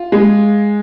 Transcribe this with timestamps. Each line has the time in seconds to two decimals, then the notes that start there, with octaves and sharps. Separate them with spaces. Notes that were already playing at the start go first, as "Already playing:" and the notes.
Already playing: F4
0.12 G#3